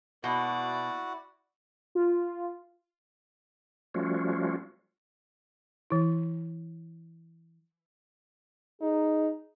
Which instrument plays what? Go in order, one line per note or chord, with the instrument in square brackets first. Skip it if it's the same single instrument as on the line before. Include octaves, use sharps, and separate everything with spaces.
[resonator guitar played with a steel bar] B2 [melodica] E4 F#4 F#5 [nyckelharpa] D5
[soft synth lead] F4
[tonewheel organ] F3 G3 A3 C#4 F4 F#4
[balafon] E3 E4
[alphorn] D#4 [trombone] G#4